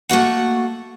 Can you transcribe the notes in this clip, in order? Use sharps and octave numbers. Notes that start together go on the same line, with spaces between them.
A3 A#3 F#4 F#5